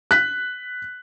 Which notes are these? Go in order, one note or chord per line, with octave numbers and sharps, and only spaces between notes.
F#6 B6